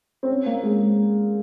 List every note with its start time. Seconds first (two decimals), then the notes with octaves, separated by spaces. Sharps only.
0.23 C4
0.30 C#4
0.46 A#3
0.63 G#3